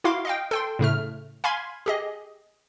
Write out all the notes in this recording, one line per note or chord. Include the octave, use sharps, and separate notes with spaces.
E4 F#4 F5 C6 D6
D#5 F5 G5
A4 G5 C6
A2 C#3 A3 F6
F5 G#5 B5 C6 G#6
G4 G#4 D#5